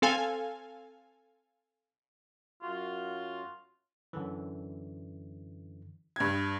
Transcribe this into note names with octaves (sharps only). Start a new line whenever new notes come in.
C4 A4 F5 G#5
F#2 F4 F#4
F#2 D3 E3
G2 G#6